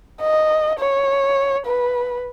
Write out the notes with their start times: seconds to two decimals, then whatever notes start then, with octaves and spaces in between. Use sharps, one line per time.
0.21 D#5
0.79 C#5
1.66 B4